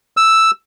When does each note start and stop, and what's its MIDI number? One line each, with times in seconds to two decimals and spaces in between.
0.17 0.51 88